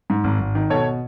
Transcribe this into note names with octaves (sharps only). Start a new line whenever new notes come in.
G#2
G#1
G#1
D#3
B2 A4 C#5